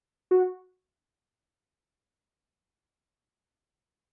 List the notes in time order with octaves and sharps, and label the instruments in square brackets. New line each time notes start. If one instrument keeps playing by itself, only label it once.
[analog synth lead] F#4